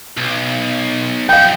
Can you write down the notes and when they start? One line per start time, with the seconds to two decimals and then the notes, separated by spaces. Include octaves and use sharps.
0.17 B1
1.29 F#2 F3 F5 G5 G6